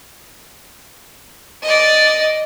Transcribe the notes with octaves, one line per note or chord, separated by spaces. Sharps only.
D5 D#5